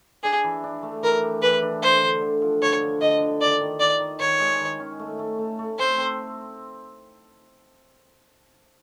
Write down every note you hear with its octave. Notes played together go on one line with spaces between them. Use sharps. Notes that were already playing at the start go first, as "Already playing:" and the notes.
D4 G#4
E3
D4
A3
E3 A#4
G4
E3 B4
D4
A3 C5
D3
D3
F3
D3 C#5
D3
D3 D#5
D3
D#3 D5
D#3
D#3 D5
D#3
D#3 C#5
G#3
D#3
C#4
A3
A3
A3
A3
C4 C5
C4